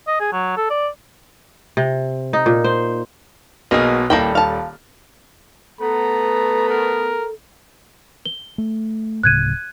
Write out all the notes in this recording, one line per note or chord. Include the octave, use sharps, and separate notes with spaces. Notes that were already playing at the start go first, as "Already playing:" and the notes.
D#5
G#4
F#3
A4
D5
C3
D#4
A#2
C5
B1 B2 A#3 G#4 F6
D#1 G3 A#3 E4 A4 G5
F5 A5
A3 B3 A4 A#5
A#4
G7
A3
D1 A2 C#3 F#6 G#6 D#7